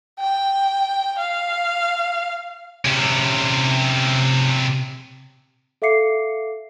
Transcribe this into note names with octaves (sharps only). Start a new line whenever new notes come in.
G5
F5
C3 C#4
A4 E5 F5 D6 C7 C#7